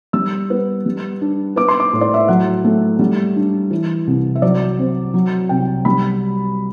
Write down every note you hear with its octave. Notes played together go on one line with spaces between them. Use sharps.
G3 E6
B3
G3
D4
B3 D6
C6
D6
A2
D5
E5
F#3 F#5
A3
G3
D4
E3
C2
E5
F#3 D5
C4
F#3
C2 G5
G3 B5